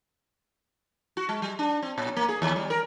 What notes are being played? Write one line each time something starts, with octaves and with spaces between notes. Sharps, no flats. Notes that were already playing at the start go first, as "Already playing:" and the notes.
F#4
G#3
G3
D4
C4
A#2
A#3
G#4
D#2
G3
A#4